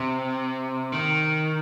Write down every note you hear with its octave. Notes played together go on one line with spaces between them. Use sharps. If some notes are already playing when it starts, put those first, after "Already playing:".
Already playing: C3
D#3